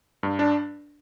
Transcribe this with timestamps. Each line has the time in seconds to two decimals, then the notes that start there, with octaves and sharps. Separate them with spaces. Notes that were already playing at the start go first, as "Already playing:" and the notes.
0.23 G2
0.39 D4